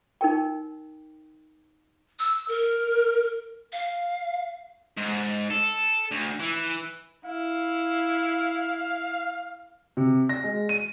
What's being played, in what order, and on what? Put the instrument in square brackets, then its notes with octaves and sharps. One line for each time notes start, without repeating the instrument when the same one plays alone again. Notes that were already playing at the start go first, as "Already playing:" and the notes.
[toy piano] D#4 A#4 G5
[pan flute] E6
A#4
F5
[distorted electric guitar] G#2
A4
D2
E3
[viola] E4 [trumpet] F5
[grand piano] C3
A#6
G#3
D#7